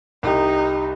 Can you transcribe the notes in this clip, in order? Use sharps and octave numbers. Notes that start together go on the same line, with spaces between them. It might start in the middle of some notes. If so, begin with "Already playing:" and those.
C2 D#4 G4